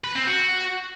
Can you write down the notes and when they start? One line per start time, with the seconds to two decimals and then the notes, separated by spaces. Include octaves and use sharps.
0.04 B4
0.16 C4
0.27 F#4